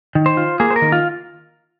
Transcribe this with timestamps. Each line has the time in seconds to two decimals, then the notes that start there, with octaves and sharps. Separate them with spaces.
0.15 D#3
0.26 C5
0.37 F4
0.60 A#3 G#4
0.71 C5
0.76 A#4
0.82 D#3
0.92 F4